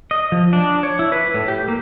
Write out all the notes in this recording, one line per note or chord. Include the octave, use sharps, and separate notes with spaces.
D#5
F3
D4
C#5
E4
B4
A2
G4
A#3